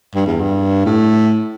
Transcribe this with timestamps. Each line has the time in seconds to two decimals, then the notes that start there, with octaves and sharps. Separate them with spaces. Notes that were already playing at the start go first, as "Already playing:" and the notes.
0.15 G2
0.26 E2
0.41 G2
0.86 A2